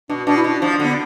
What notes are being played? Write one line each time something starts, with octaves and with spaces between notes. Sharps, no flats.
B2 D4
B2 D4
E4
B2 D4
F3 D4
D3 B3